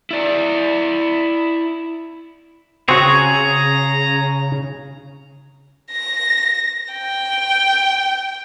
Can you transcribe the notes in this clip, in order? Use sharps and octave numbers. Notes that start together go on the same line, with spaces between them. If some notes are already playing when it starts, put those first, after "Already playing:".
E4 D5
C#3 C4 F#4 G#4 C#5 A#5
A#6
G5